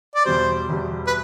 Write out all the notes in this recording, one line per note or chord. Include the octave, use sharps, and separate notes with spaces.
D5
E2 B2 G3 C5
E2 B2 G3
B4